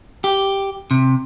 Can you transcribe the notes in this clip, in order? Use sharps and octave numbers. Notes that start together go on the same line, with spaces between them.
G4
C3